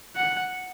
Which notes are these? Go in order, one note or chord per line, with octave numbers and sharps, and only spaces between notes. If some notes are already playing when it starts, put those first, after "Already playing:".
F#5